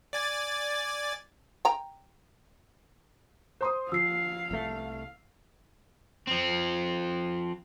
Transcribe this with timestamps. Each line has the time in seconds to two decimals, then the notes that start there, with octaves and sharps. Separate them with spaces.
0.13 D5 G#5 A6
1.65 G5 A#5
3.61 C5 C6 D#6
3.92 F3 F5 E6 C7
4.51 C2 A3
6.27 F3 C4